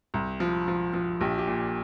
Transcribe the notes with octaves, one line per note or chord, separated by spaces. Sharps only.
C2
F3
F3
F3
A#1 G4
G4
A#2